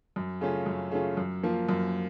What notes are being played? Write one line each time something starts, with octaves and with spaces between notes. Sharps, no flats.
F#2
C#3 A3 C#4 F4
F#2
C#3 A3 C#4 F4
F#2
F3 A#3 F4
F#2